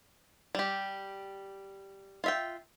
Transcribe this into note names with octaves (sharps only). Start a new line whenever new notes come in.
G3 G4
F4 E5 G5